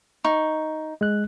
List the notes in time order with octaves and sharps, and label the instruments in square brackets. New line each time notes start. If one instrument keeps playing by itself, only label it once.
[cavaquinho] D#4 C#6
[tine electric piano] G#3 F#6